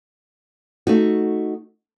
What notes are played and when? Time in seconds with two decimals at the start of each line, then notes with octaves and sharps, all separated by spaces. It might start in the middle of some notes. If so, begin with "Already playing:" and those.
0.87 A3 D#4 F#4